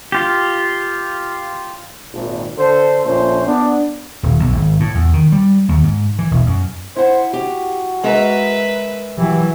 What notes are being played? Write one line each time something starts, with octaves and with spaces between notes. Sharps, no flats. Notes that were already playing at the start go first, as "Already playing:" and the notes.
F4 G4
G#1 A#2
D3 A4 C5
A#1 F2 A#2 A3 C#4 C5
B3 D4
D#1
B1
G#1
A2
E2
D#3
G3
D#2
G#2
E3
E1
F#2
E4 C5 F#5
F#4 G4
G#3 A#4 B4 E5 A#5
E3 F#3 G4